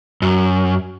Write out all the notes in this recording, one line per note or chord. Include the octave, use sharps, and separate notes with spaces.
F#2